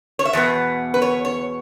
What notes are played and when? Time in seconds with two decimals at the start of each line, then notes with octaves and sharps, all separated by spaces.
0.19 C#5
0.25 E5
0.33 E2 B2 B3
0.94 B4
1.02 C#5
1.25 C#5